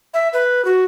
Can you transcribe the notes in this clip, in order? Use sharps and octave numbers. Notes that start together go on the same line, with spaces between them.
E5
B4
F#4